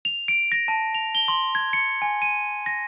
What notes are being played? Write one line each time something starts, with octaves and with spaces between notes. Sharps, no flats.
F7
D7
A#6
A5
F7
G7
C6
G#6
C#7
G#5
D#7
A#6